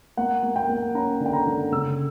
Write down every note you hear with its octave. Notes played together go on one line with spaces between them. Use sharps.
A#3 F#5
A#3
G5
A#3
C#4 A#5
D3
G5
A#5
D3
C#3 E6